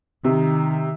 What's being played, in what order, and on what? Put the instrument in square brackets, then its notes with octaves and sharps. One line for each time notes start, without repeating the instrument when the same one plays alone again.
[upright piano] C3 [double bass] D#3